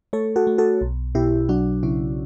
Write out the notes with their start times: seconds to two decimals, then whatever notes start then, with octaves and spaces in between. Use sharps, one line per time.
0.13 A3 A4 C#5
0.36 F#4 A4
0.47 A3
0.58 F#4 A4
0.81 B1
1.15 B2 E4 G4
1.49 F#3 D4 F#4
1.83 C#3 C#4 E4